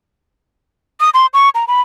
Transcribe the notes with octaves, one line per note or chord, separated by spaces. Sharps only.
D#6
C6
C#6
A#5
B5